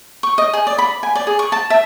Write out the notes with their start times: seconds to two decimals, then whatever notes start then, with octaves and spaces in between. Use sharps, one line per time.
0.23 C#6
0.38 D#5
0.53 G#4
0.67 D5
0.78 B5
1.03 G#5
1.15 D5
1.27 G#4
1.39 C#6
1.52 A5
1.70 E5